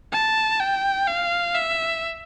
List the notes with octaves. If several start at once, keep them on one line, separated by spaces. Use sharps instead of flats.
A5
G5
F5
E5